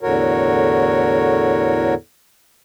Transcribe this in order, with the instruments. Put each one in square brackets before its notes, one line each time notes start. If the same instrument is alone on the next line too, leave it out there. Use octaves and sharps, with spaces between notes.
[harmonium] E2 A2 D3 F#4 A#4 C#5